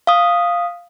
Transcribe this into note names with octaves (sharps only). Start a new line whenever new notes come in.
F5 D#6